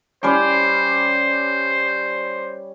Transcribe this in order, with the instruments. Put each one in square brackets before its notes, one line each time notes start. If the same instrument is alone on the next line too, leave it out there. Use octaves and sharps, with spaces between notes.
[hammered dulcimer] G3 C#4 D6 [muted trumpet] C5